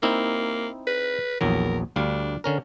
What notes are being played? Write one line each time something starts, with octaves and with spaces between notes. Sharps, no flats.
A#3 C4 D#4 E4
B4
A#1 E2 F#3 A#4
D2 G3 D4 F5
D3 C#4 A#4